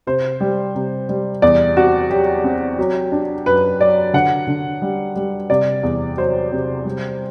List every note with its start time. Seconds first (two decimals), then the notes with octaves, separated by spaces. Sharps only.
0.07 C3 C5
0.41 G3
0.75 C3
1.09 G3
1.42 E2 D5
1.77 C4 F#4
2.10 F#3 G4
2.44 C4
2.79 F#3
3.12 D4
3.46 F#2 B4
3.81 F#3 D5
4.13 D3 F#5
4.47 D3
4.82 G3
5.16 G3
5.50 C3 D5
5.83 E2
6.17 F#3 C5
6.52 C3
6.85 G3